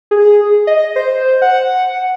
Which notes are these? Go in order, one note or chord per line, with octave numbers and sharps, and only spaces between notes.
G#4
D#5
C5
F#5